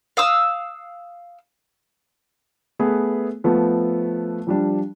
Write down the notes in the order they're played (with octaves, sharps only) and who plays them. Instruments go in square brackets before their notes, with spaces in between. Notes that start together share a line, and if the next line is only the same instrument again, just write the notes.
[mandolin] F5 D#6 E6
[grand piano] A3 B3 G#4 B4
F3 A3 B3
F3 G3 D4